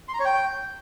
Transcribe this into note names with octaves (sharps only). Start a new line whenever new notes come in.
C6
A#5
C#5
G5